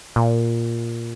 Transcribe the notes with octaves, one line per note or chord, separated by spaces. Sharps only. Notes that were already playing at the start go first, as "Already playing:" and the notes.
A#2